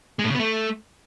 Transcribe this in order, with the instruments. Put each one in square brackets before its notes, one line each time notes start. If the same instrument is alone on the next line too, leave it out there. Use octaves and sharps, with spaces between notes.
[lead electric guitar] G#3
A2
C#3
B3
A3